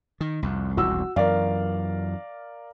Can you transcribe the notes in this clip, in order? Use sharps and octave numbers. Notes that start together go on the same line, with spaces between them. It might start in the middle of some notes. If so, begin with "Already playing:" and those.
D#3
C2 F2
E1 C2 F2 F#4 E6
F#2 E3 A#4 D5 F5